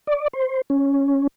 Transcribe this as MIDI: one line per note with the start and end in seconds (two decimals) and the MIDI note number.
0.07 0.28 74
0.33 0.61 72
0.70 1.27 61